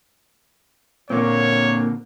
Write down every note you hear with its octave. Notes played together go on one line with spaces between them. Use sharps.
A#2 D3 A#3 C4 C#5